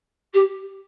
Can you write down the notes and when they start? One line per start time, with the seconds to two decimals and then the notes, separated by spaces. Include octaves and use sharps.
0.33 G4